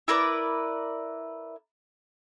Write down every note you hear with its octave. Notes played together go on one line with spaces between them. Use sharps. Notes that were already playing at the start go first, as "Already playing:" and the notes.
E4 A#4 B4 D5